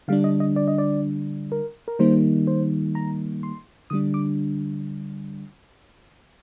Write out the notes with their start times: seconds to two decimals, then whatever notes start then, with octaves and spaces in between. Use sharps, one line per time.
0.08 D3 G3 D4 F5
0.24 D#5
0.40 D#5
0.56 D5
0.68 D#5
0.78 D5
1.52 A#4
1.88 A#4
1.99 D#3 G3 A#3 D#4 C5
2.47 C5
2.95 A#5
3.43 C6
3.90 D3 G3 D4 D#6
4.14 D6